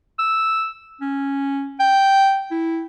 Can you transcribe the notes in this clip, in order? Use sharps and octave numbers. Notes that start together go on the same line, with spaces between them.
E6
C#4
G5
E4